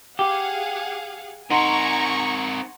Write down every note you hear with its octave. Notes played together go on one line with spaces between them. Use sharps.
G4 G#4 F5 F#5
C4 D#4 A#4 F#5 G#5 A#5 C6 C#6